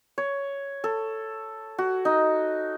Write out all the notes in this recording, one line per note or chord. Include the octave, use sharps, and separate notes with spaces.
C#5
A4
F#4
D#4